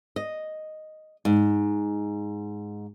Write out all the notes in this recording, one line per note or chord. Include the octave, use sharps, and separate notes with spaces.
D#5
G#2